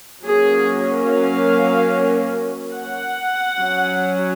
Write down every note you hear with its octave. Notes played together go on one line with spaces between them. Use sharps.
F#3 A#3 C#4 G#4
F5
F#5
F#3 C#4